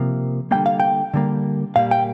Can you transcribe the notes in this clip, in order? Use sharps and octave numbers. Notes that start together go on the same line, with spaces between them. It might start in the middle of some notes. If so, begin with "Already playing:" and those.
Already playing: C3 F3 A#3
D3 G3 A#3 G5
F5
G5
D3 G3 A#3
A#2 G3 A#3 F5
G5